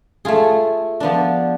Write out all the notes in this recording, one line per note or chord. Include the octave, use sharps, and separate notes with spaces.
A3 F4 G#4
F3 B3 D4